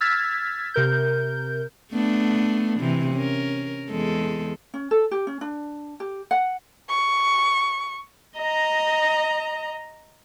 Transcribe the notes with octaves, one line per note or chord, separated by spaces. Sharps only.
E6 F6 G#6 A6 B6
C3 A#4 G6
A3 B3 D4
C3 E3
C#4 A#4
E2 G#3 A4
C#4
A4
G4
C#4
D4
G4
F#5
C#6
D#5 A#5